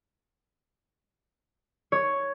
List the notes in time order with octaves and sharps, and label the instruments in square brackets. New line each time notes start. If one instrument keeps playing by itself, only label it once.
[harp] C#5